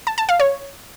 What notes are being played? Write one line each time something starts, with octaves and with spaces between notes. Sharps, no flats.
A5
A5
F5
C#5